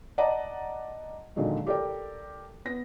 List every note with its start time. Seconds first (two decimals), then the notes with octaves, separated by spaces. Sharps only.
0.18 D5 D#5 F#5 A5 A#5
1.36 A#2 D3 D#3 F#3 G#3
1.67 G4 A4 A#4 D5 G5
2.65 B3 A#6